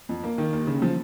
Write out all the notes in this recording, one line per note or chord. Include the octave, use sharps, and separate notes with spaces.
F2
A#3
D#3
D#2
C#3
F3